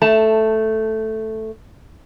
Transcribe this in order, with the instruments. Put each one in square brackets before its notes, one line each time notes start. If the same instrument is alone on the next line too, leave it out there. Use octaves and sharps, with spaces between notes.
[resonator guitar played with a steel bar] A3 A5